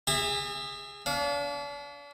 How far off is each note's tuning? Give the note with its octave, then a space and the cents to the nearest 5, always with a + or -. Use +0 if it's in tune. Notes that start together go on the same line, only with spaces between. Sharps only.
G#4 -25 E5 +0 A5 +45
D4 -40 F5 +0